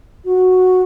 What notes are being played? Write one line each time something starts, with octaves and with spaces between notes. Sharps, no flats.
F#4